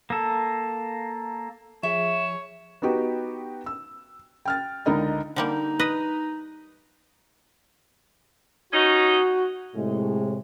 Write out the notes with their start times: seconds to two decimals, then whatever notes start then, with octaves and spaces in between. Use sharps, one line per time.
0.10 A#3 A4
1.83 F3 G#4 C#5 E5 E7
2.82 B3 D#4 F#4 G4 B4
3.66 E6
4.45 G5 F6 A6
4.86 C#2 D3 D#4 A#4 D#5 B5
5.36 D3 G3 A#3 D#4
5.79 B4 D#5
8.73 C#4 D#4 F#4
9.75 A2 C3 G#3